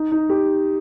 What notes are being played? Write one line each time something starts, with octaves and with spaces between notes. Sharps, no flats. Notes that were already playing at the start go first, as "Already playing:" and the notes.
Already playing: D#4
D#4
G4